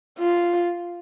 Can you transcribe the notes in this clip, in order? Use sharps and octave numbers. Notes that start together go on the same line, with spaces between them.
F4